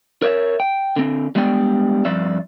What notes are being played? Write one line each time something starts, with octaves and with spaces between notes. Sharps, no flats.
A#4 C#5 D5 E5
G5
D3 C4
G3 G#3 B3 D4 D5 G5
G2 F3 C4 D5 E5